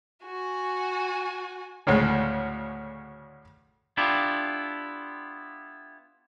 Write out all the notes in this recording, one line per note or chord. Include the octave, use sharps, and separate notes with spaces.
F#4 G#5
D2 A2 C#3 G#3
B3 D4 E4 F4 G4